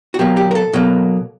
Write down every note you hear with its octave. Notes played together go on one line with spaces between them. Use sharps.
F#4
B2 F#3 A#3 G4
G4
A#4
A4
B2 F#3 A#3